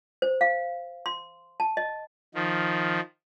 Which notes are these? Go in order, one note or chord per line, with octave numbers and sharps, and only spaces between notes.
C5
F5
C6
A5
D#5
D#3 F3